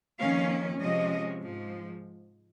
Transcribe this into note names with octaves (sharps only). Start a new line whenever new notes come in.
F2 D#3 A#3 C#4 F5
C3 F3 G#3 C#4 D#5
G#2 F3 G#3